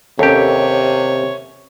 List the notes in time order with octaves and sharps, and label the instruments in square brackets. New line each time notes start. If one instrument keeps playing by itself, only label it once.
[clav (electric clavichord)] D#2 G4 [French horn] C3 [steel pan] C#4 A4 [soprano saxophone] C#5